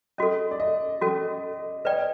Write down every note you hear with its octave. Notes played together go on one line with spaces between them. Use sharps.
C#4 F#4 A4 D#5
D5
D#5
C#4 F#4 A4
B4 D5 D#5 G5